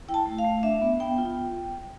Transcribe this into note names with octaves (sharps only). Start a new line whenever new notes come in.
E4 G5
A5
A3
F5
A3
D4 E5
B3
B3 G5
F4